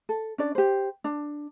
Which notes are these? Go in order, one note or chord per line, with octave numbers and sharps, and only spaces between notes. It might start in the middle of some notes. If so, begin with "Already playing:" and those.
A4
C#4 D4 D5
G4 C5
D4